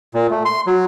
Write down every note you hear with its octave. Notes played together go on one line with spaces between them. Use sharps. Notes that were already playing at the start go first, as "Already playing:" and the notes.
A#2
A3
C6
F#3